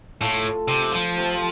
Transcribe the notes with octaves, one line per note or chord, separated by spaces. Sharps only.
A2 A3 F4 A4
C3
F3
C3 A3 C4